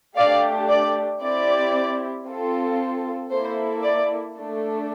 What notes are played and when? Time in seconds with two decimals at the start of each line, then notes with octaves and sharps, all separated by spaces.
0.17 A3 D4 G4 D5 F5
0.69 D5
1.22 C4 E4 G4 D5
2.26 C4 F4 A4
3.30 A#3 E4 A4 C5
3.83 D5
4.35 A3 D4 A4